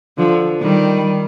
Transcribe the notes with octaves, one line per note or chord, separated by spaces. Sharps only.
D3 F3
D#3 G3